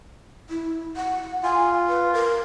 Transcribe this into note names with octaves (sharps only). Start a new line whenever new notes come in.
E4
F#5
F4 G#5
B4
A#4